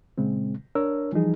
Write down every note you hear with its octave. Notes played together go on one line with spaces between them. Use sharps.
A#2 C#3 G#3 C4
D4 A#4 C#5 E6
E3 F3 G3 D#4 G#4